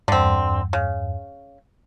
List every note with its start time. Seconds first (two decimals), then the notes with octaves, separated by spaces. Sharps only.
0.08 E2 G2 D3 C4
0.73 C#3